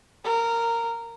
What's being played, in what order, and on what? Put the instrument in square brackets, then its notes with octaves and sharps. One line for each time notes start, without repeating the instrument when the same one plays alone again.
[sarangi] A#4